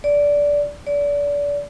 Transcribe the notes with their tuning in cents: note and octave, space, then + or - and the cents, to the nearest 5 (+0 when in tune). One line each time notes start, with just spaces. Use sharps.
D5 -15
D5 -30